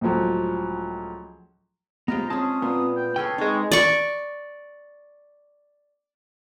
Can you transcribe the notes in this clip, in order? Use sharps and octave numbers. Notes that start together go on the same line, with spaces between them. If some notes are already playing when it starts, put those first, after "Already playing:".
C#2 A2 F3 F#3
G#3 B3 F4 G4 C5 A#5
C4 C#4 G#4 A5 D#6
A#2 B3
G5
C#4 G#4 A4 B4 G5
G#3 C4 D#4 C#6
D5 C#6